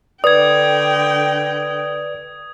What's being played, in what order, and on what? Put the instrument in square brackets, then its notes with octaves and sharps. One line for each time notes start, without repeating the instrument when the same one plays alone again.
[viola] D3 G5 [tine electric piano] B4 D5 [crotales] D#6 G#6